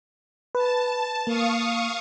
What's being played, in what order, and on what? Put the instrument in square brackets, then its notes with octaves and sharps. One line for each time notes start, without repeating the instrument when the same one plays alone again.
[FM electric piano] B4 [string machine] A5
[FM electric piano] A#3 [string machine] F5 C#6 D#6